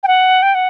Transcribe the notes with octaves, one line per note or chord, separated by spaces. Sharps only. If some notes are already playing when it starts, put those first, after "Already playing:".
G5
F#5
G5
F#5